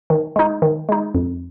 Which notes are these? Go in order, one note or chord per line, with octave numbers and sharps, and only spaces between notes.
D#3
G#3 D#4
D#3
G#3 D#4
F2